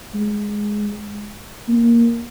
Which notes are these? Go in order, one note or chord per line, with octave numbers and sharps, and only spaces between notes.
G#3
A#3